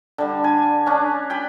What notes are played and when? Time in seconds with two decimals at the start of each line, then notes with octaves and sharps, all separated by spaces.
0.18 D3 G3
0.44 G#5
0.86 C#4 D4
1.30 G5 G#5 B5